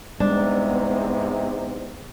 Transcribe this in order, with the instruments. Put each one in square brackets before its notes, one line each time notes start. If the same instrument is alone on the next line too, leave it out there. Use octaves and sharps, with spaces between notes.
[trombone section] E2 G#2 C3 [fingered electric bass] G3 G#3 [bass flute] B3 [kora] D4